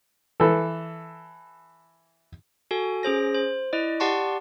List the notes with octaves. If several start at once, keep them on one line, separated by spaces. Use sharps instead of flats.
E3 A4
F#4 A4 G#5
C#4 G#4 C5 A#6
C5
E4 D5 D#5
G4 D5 F#5 A5 C6 C#6